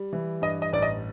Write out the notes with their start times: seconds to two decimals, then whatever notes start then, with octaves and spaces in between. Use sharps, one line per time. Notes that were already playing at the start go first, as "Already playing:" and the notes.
Already playing: G3
0.13 E3
0.42 G2 D#5
0.62 D#5
0.73 A1 D5
0.82 D#5